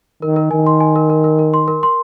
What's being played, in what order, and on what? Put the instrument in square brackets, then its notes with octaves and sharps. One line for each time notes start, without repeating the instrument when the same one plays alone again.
[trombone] D#3 [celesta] A#4
[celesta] A#4
[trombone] D#3 [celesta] G#5
[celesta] C6
G#5
A#4
A#4
A#4
A#4
C6
A#4
C6